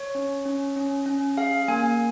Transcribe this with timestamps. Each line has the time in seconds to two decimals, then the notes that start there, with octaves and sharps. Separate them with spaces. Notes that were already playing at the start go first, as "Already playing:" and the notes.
Already playing: C#5
0.15 C#4
0.45 C#4
0.76 C#4
1.06 C#4
1.37 G#4 F5
1.68 A#3 G#5